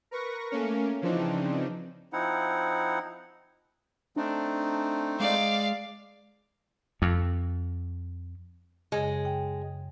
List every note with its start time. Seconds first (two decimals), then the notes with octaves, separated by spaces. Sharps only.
0.11 A#4 B4 C#6 A#6
0.51 A3 A#3 C#4 A#4
1.01 C#3 E3 F3 C4 D4 D#4
2.13 F3 C4 D#4 E4 F#5
4.16 A3 C4 D4 D#4
5.20 G#3 D5 F5
7.02 F2
8.92 F#2 C#3 G#3
9.25 G5